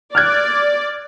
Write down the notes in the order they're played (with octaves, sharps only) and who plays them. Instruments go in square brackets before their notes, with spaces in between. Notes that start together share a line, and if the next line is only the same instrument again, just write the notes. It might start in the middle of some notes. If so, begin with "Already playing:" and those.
[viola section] D5 [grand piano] F6 F#6 G#6